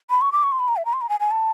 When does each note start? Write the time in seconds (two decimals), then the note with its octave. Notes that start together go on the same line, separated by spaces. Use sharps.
0.10 B5
0.21 C#6
0.32 D6
0.43 C#6
0.52 C6
0.59 B5
0.68 A#5
0.77 E5
0.85 A#5
0.93 C6
1.01 A#5
1.09 G#5
1.20 G#5
1.31 A5